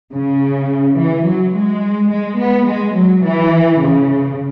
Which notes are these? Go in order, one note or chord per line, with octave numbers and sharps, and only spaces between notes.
C#3
E3
F#3
G#3
G#3
B3
G#3
F#3
E3
C#3